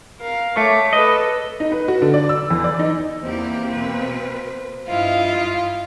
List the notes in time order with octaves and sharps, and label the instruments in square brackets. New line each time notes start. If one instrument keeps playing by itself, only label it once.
[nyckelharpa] A#4 F5
[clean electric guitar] A3 [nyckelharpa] C#5 D6
[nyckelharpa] A4 B4 [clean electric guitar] D#5
[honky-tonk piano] D#4
B4
F#4
D3
D5
E6
E2
D5
D#4
[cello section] E2 E3 G4 [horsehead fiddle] A#3 C4 [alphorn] C5
[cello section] B2 B4
[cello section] G2 E4 [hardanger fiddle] F4 [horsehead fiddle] D#5 F5